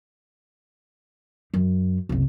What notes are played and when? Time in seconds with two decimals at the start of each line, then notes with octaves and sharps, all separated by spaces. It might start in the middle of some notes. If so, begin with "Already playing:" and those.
1.54 F#2
2.09 F#1 C2